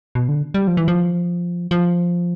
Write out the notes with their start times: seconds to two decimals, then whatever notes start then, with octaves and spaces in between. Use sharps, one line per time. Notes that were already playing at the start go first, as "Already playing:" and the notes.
0.15 B2
0.29 D3
0.54 G3
0.67 F3
0.77 E3
0.88 F3
1.71 F3